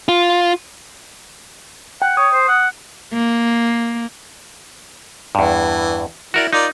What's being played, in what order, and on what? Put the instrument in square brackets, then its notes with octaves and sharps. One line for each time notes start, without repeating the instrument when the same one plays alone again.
[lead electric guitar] F4
[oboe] F#5 [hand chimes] G5
[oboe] C#5 [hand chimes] D#6
[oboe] C5
F#5
[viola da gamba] A#3
[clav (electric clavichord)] E2 G2 [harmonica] E3
[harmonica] E4 [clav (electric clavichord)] F#4 A#4 D5
[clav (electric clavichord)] D#4 [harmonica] F4 A#4 D5